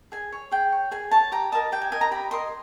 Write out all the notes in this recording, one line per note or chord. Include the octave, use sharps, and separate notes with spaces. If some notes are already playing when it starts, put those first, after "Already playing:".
G#4 G#5
C#5
G#4 G5
C#5
G#4 G#5
C#5 A5
G4 A#5
A#4 D#5 A5
G4 G5
G#5
A#4 D#5 G#5
A#5
G4 B5
A#4 D#5 C6